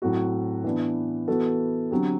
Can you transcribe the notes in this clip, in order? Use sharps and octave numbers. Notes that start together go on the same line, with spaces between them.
A2 F#3 C4 F#4
E3 B3 D4
E3 B3 F#4 A4
D3 F#3 C4 G4